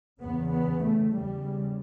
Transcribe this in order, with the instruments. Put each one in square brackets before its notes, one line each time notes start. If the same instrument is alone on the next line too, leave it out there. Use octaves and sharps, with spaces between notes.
[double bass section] E2 C#3 B3
B3
A3
E2 C#3 G3